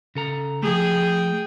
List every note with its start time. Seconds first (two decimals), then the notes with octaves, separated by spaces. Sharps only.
0.15 C#3 A4 A#5
0.63 F3 A3 G#4 G5